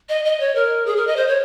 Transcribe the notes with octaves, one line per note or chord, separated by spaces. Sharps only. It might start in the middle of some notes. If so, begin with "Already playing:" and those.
D#5
D#5
C#5
A#4
G#4
A#4
D#5
C5
C#5